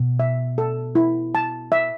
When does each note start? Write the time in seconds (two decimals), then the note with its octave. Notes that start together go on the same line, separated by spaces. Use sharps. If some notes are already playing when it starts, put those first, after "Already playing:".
Already playing: B2
0.20 E5
0.58 A4
0.95 E4
1.35 A5
1.72 E5